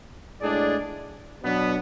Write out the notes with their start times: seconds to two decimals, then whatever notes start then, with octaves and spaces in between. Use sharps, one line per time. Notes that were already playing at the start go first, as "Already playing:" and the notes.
0.41 A2 G#3 D4 G#4 D5
1.41 B2 F#3 B3 D4